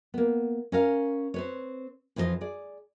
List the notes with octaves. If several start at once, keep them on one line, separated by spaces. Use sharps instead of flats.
A#3 B3
C#4 A#4 F5
C4 B4 C#5
F2 E3 F3 G#4 D#5
G#4 D5